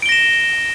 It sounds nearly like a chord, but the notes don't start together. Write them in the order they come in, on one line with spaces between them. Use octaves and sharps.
D7 G7 A#6 E7